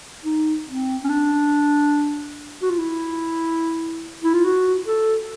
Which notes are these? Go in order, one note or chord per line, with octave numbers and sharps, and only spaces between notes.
D#4
C4
C#4
D4
F#4
F4
E4
E4
F4
F#4
A4